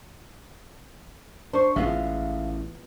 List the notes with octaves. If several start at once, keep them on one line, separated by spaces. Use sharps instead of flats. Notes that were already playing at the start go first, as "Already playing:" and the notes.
D4 C5 C#6
A1 G#3 B3 F4 E5 F5